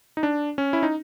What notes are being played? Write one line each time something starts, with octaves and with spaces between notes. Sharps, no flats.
D#4
D4
C#4
E4
D#4